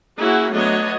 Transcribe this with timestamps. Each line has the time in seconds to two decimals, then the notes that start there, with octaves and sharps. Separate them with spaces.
0.19 A#3 C#4 E4 F#4 G#4 F#5
0.53 F#3 A3 B3 D4 C#5 D#5